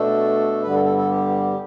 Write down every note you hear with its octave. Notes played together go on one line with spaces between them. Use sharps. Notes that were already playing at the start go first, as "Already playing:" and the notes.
Already playing: B2 A3 D4 A4
G2 D3 G3 B3 B4
A4
A4
A4
G4